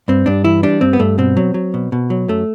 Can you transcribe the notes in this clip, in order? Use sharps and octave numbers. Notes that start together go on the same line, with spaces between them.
G2 C4
G2 D4
E3 E4
G3 D4
G2 C4
B3
G2 A3
B2 C4
F#3
F#3
B2
B2
F#3
F#2 A3